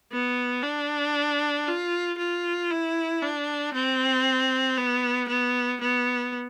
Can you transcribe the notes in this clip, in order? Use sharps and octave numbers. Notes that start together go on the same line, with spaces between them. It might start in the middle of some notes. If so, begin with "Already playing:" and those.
B3
D4
F4
F4
E4
D4
C4
B3
B3
B3